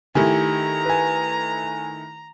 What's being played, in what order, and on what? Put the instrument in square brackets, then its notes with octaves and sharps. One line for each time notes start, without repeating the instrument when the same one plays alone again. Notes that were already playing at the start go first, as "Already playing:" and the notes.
[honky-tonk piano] D#3 A3 E4 [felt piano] G4 [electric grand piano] G#5 [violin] A#5
[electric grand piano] B4 G#5